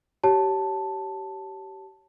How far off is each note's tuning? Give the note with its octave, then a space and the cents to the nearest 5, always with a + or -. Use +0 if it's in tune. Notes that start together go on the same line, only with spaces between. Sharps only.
G4 -25 C#5 +0 A5 +0